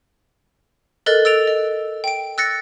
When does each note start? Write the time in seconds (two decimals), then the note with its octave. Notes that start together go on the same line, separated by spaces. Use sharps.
1.06 A4 A#4 D#5 F#6 A6
1.25 E6 A6 D7 F7
1.47 D#5
2.04 G5 D7
2.38 E6 F#6 A6 A#6 C#7